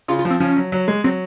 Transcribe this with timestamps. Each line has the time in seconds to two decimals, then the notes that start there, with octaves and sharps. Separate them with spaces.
0.08 C#3 F4
0.19 F4
0.25 F3
0.30 C4
0.40 F3 C#4
0.57 F#3
0.72 F#3
0.88 G#3
1.04 F#3 C4